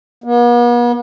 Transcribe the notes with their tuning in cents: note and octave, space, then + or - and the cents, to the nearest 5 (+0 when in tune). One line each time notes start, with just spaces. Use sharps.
B3 -45